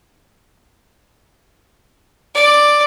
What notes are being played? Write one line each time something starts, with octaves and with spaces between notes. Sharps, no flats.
D5